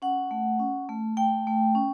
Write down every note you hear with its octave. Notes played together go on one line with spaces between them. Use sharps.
C#4 F#5
A3
C#4
A3
A3 G5
A3
C#4